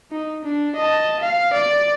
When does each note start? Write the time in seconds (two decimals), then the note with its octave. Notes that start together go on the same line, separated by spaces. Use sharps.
0.12 D#4
0.45 D4
0.76 D#5 A5
1.20 F5
1.53 D5